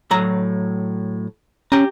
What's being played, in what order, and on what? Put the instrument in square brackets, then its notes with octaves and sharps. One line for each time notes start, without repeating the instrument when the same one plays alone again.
[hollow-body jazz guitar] A2 F#3 A#5
[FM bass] C#4 [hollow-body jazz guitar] G4 A#5